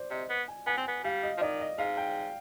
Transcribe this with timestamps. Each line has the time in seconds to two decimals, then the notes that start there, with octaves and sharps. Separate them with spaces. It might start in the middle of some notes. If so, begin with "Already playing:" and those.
Already playing: C5 D5
0.11 C3 D#5
0.29 B3
0.48 G#5
0.67 B3 G#5
0.78 C4
0.88 B3
1.04 G3 F5
1.23 D#5
1.38 F3
1.41 D#3 D5
1.61 D#5
1.78 G#2 F5
1.97 G5